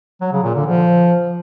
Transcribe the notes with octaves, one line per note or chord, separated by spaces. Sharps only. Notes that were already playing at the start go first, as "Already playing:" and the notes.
F#3
C#3
A#2
D3
F3